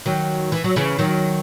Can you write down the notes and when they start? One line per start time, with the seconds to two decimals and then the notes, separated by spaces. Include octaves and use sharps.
0.06 D#3 F#3
0.52 E3
0.64 F#3
0.76 C#3 E3
0.99 D#3 F#3